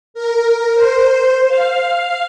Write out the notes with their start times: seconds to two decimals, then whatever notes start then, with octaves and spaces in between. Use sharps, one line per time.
0.14 A#4
0.74 C5
1.48 F5